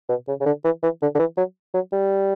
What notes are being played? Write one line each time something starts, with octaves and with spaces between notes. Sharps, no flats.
B2
C#3
C#3
D3
E3
E3
D3
D3
E3
F#3
F#3
G3